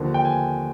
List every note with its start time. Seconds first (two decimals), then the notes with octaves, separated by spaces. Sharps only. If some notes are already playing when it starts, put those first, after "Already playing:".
Already playing: D#2 D3 F3
0.14 G5
0.25 G#5